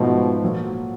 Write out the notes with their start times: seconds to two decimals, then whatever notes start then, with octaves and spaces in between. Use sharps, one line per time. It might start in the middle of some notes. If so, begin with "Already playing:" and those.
Already playing: G#2 B2 F3 A3
0.42 A#2 F#3 A#3